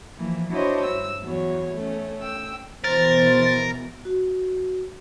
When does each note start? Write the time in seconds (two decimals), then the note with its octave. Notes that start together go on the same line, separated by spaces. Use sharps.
0.18 E3 F3 A#3
0.53 D4 E4 F#4 C5 C#5 D#5
0.85 G2 E6
1.23 E2 F#3 C#5
1.74 A3 C#4
2.21 G5 E6
2.84 B2 E3 A#4 C5 A6
4.05 F#4